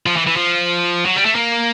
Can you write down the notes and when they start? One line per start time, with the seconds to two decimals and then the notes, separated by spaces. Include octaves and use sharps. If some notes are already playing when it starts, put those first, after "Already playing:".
0.06 F3
0.17 E3
0.27 E3
0.37 F3
1.06 F#3
1.16 G3
1.25 A3
1.35 A#3